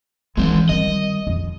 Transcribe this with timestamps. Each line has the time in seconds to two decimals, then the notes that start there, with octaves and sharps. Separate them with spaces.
0.37 D#3 E3 G#3 C4
0.69 D#3 G3 D#5
1.27 F2